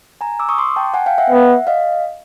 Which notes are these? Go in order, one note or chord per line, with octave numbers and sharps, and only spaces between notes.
G#5 A#5
D6 E6
C#6 D#6
C6 D6
G5 A5
F#5 G#5
F5 G5
E5 F#5
B3
D#5 F5